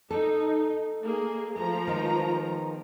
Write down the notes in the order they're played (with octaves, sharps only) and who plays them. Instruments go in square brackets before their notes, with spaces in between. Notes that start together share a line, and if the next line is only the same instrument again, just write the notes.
[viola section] D#4 [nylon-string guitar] A4
[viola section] A#3 G#4
[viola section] F3 A#5 [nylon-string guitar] A3
[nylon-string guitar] D#3 G#3 B3